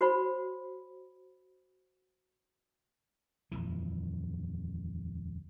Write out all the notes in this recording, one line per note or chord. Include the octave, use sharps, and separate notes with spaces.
F#4 C5 C#5 B5
D#1 F2 E3